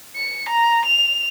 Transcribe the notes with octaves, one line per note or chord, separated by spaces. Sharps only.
C#7
A#5
F7